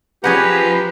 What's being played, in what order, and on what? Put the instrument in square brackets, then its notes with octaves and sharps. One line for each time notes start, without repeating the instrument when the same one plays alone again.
[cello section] F3 [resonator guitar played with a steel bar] C#4 G#4 F#5 [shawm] G4 [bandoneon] B4 A#5